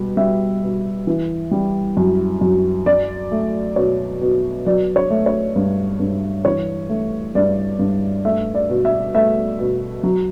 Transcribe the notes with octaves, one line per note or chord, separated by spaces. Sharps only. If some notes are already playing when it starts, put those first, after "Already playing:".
Already playing: B2 G3
G3 E5
B2
E3
G3
F#2
F#2
F#3 D5
A3
B2 C#5
B2
F#3 D5
C#5
A3
C#5
G2
G2
E3 C#5
A3
G2 D5
G2
A3 E5
D5
B2
E5
A3 E5
B2
F#3